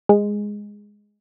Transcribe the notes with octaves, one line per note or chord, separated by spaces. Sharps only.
G#3